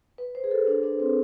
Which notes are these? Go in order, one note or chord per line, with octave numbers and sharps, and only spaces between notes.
B4
C5
G#4
A4
D4
D4
C4